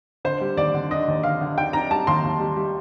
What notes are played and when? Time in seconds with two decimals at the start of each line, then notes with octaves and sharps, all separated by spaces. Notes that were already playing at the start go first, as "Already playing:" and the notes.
0.25 D3 C5
0.41 G3
0.57 D#2 D5
0.74 D3
0.91 D4 D#5
1.08 D#2
1.23 D3 F5
1.41 D3
1.58 D4 G5
1.73 D4 A#5
1.91 G3 A5
2.07 D#2 C6
2.24 D#2
2.40 G3
2.56 G3